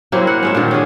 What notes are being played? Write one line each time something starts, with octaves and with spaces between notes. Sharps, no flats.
F#3 A#3 C4 E4
F#5
G#3 C#4 E5
A#2 D3 D#3
C#4 G#4